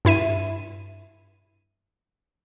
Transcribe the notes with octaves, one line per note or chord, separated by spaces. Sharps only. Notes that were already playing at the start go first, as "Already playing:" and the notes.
G2 E4 E5 D#7